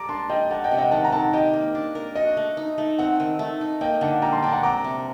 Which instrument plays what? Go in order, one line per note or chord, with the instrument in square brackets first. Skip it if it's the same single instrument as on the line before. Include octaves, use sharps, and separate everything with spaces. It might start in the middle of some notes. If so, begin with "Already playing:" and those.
Already playing: [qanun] G3 A4 [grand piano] A#5 D6
[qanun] D4 [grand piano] A5 C6
[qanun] G3 [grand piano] D#5 G5
[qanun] A3 [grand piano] F#5 A5
[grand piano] D#5 G5
[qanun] C3 [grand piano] F#5
[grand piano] D#5 G5
[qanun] D#3 [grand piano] F#5 A5
[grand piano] A#5
[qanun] C4 [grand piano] F#5 A5
[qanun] G4 [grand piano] D#5 G5
[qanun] A#3
D4
A#4
[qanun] F#4 [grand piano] D#5
[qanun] A3
D#4
A3
[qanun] C4 [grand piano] F#5
[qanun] D#3
A3
D#4
[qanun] A#3 [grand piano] D#5 G5
[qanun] D3 [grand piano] F#5 A5
[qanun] G3 [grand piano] G5 A#5
[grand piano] A5 C6
[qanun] D4 [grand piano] G5 A#5
[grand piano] F#5
[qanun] C4 [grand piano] A#5 D6
[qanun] C3